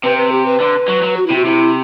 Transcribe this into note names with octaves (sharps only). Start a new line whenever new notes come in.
C3 B4
B4
G4
B4
D3
F#3
F#3
F#4
C3 E4
F#4
C3 E4